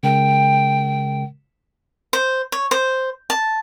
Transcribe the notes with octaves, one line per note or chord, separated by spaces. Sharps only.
C#3 G#3 A#4 G5
C5
C#5
C5
A5